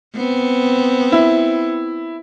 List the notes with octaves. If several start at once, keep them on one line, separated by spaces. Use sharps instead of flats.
B3 C4
E4